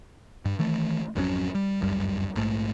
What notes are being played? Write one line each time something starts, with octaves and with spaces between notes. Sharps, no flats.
G2
D#3 E3 A3
G#1 F2 F#3 C#4
G3
D1 G1 F#2 G3
A#1 G#2 A3